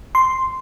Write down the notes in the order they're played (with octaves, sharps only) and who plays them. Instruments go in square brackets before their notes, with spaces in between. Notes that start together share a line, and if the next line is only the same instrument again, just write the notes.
[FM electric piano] C6